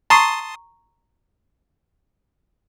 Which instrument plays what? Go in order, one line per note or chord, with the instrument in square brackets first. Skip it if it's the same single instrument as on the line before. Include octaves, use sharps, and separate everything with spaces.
[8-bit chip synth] A5 C6 D#6 [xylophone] A#5 C#6 C7